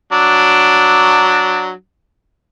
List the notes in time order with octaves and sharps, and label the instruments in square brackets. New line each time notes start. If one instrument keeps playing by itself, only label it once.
[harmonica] F#3 D4